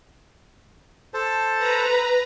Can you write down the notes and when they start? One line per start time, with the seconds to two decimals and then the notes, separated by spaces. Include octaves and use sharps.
1.14 A4 C5 A5
1.58 B4 A#5